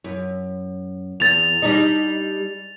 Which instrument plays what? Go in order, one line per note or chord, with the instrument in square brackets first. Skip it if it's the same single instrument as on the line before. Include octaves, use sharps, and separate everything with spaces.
[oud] F#2
[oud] E2 [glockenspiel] A6 F7
[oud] G3 D4 D#4